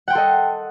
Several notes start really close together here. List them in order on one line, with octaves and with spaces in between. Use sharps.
F#5 G5 C6 A4 D#5